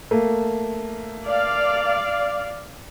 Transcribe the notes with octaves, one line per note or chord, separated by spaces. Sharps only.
A3 A#3
D5 F5